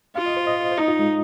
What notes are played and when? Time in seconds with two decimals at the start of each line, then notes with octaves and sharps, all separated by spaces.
0.15 F4 F5
0.26 D#5
0.37 C5
0.47 D#5
0.72 C5
0.77 D#4 D#5
0.88 F4
0.99 G#3